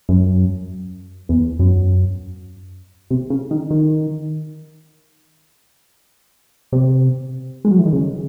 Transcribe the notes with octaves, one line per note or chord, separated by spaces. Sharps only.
F#2
E2
F#2
C3
C#3
D#3
D#3
C3
G#3
F#3
E3
D#3
C#3